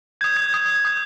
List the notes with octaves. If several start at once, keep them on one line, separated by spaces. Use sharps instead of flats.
D#6 G6 G#6
G#6
D#6 G6
D#6 G6